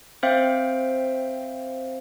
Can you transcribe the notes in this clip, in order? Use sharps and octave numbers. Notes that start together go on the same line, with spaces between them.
C4 C5 E5 F5 G5